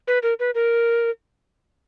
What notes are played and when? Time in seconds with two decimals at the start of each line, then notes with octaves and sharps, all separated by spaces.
0.07 B4
0.23 A#4
0.40 B4
0.55 A#4